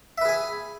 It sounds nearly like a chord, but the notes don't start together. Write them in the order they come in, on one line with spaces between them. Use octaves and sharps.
E5 B4 G#4 G#5